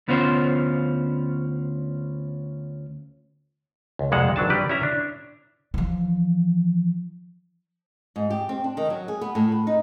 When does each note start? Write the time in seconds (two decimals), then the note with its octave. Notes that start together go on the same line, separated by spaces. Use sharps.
0.08 D2 B3 C#4 F4 C5
3.99 C#2
4.12 C2 F2 G#3 A#3 F#5 A5
4.36 G#1 F#3 D4 A5
4.50 G3 G4 B4 D5
4.69 C#4 E4 E5 A#5
4.83 D4
5.74 E3 F3
8.16 G#2
8.30 G4
8.49 C4
8.64 D4
8.77 D#3
8.90 F#3
9.08 G#4
9.21 B3
9.35 A2
9.52 B4
9.67 D#4